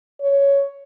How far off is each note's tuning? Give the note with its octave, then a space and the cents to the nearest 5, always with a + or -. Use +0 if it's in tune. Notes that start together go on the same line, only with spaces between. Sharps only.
C#5 +10